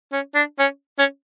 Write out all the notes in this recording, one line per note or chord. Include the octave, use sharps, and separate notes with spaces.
C#4
D4
C#4
C#4